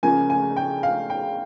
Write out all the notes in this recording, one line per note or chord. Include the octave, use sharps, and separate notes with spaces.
C#2 C#3 F3 A#3 G#5
G#5
G5
F5
G5